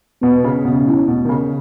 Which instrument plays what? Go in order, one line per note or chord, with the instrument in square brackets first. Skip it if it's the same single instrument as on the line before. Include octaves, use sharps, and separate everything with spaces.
[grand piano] B2 [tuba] B3
[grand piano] C#3
[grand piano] B2 [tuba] C#4
[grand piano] A2
B2
D#3
C#3